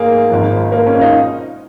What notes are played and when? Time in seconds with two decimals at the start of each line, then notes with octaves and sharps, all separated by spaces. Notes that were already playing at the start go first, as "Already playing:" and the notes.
Already playing: G#2 A#3 G#4
0.30 G#1 G#2 F3
0.72 A#3
0.87 C#4
0.97 F4
1.01 D#4